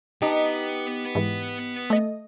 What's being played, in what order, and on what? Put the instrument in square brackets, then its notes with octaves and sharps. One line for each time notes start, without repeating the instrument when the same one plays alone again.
[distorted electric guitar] B3 B4 [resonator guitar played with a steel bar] D#4 G4
[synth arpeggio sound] G#2 E3
A3 D#5